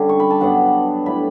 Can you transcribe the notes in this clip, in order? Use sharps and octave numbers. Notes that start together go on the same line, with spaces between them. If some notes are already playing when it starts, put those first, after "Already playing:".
Already playing: D3 G3 C#4
C#6
B5
A5
G2 F#3 B3 D4 F#5
A2 G3 D4 B5